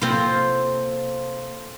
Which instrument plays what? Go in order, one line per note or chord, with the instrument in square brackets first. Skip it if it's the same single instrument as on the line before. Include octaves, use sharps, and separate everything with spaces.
[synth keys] C3 A#3 [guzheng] C4 F4 [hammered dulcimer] A4 C5 F5